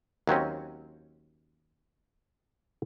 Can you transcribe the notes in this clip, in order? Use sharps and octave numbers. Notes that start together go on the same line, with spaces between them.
D#2 F#3 C4 C#4